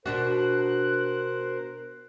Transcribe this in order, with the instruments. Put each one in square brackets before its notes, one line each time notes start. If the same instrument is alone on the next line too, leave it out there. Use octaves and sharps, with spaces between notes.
[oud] B2 D4 F#4 [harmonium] A#4 C5 [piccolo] F#6